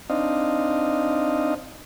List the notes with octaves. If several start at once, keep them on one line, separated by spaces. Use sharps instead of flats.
C4 D4 D#4 D#5 F5